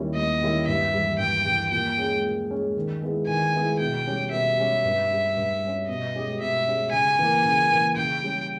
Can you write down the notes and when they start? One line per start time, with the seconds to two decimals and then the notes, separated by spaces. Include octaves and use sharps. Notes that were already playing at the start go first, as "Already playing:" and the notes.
Already playing: D#2 D#3 G3 C#4 E4
0.15 D#2 D#5
0.41 D#3 G3 C#4 E4
0.67 G2 E5
0.94 E3 G3
1.19 G2 G5
1.45 E3 G3
1.71 A#2 G5
1.97 G#3 C#4 G#4
2.24 A#2
2.50 G#3 C#4 G#4
2.76 D#3
3.02 G#3 B3 E4 G#4
3.28 D#3 G#5
3.54 G#3 B3 E4 G#4
3.80 B2 G5
4.06 G3 C#4 G4
4.32 B2 E5
4.58 G3 C#4 G4
4.85 G2
5.10 G3 C#4
5.37 G2
5.63 G3 C#4
5.88 B2 D#5
6.15 G#3 C#4 G4
6.41 B2 E5
6.67 G#3 C#4 G4
6.92 C#3 G#5
7.19 E3 A#3
7.45 C#3
7.71 E3 A#3
7.97 C#3 G5
8.23 G3 C#4